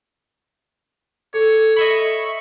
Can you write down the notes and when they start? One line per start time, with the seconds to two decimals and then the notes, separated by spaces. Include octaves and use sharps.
1.34 A4 C#5
1.77 D#5 E5 B5 C#6